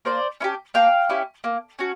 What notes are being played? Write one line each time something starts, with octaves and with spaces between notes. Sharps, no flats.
A#3 C5 D5
C#4 E4 G4
A#3 F5 G5
C#4 E4 G4
A#3
C#4 F#4